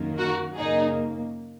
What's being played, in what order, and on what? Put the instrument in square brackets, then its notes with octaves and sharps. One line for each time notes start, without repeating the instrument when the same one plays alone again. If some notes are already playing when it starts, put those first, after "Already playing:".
Already playing: [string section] F#2 D#3 A#3
F#4 A#4
F#2 C#3 A#3 D#4 G#4